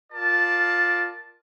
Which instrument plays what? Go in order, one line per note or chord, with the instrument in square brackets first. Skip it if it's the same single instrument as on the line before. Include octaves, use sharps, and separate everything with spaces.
[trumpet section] F4 A#4 D5 A5